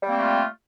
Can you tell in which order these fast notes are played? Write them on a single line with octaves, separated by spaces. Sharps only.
G3 A#3 C4 A3 F4